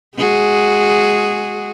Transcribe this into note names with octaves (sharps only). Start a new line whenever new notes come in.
G#3 F#4 G#4